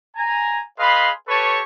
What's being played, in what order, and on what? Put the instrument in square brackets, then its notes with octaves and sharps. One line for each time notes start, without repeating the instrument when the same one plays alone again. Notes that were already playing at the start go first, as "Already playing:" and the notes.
[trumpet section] G#5 A#5
G#4 B4 D#5 F5 B5 C6
G4 A4 B4 C#5 A5 C#6